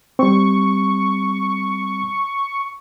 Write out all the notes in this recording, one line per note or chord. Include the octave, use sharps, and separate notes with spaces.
G3 C4 C#6